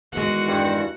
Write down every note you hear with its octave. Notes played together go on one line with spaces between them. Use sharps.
E2 D#3 G#3 F#4 F#5
G2